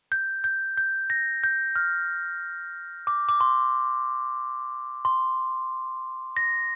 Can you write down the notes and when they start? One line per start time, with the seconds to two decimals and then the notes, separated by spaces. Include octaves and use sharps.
0.12 G6
0.44 G6
0.77 G6
1.10 A#6
1.44 G6
1.76 F6
3.07 D6
3.29 D6
3.41 C6
5.05 C6
6.37 A#6